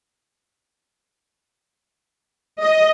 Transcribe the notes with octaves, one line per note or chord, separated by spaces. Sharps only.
D#5